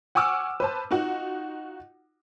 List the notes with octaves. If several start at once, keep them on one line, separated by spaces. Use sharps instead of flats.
F#5 G#5 C#6 D6 E6 F6
B4 C5 A5
D#4 F4 F#4 F#5